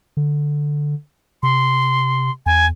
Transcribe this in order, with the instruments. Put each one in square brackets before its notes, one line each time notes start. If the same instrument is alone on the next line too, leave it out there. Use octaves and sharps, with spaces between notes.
[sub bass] D3
[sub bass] C3 [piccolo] C6
[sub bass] E2 [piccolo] G#5